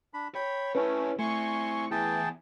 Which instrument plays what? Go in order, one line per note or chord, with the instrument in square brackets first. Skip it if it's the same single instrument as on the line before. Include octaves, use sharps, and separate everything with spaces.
[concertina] D4 B5
[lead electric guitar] C#5 [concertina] G5 B5
[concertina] A3 [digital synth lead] C#4 [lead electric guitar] E4 G4 [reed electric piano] B4
[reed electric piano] A3 [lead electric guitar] C4 E4 [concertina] G#5 C6 [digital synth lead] C#6
[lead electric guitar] E2 [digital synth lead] E3 [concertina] G#4 G5 A5